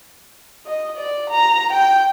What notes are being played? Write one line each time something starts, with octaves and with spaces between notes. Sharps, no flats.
D#5
D5
A#5
G5